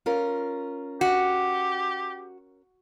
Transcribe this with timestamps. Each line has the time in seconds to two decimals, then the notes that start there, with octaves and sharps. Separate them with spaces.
0.06 C#4 F4 A#4
1.01 F#4 G4